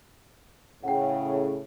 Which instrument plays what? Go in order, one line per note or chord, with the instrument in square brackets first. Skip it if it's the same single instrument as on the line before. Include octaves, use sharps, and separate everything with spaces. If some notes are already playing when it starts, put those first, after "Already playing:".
[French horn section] A2 C#3 [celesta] F#5 G5